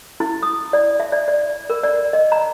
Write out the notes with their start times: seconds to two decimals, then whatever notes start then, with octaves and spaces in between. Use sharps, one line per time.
0.20 E4
0.43 D#6
0.73 D5
1.00 E5
1.12 D5
1.28 D5
1.70 A#4
1.84 D5
2.13 D#5
2.32 A#5